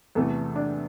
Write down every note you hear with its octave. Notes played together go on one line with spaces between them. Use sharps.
E2 C3 E3 A3 A4
D4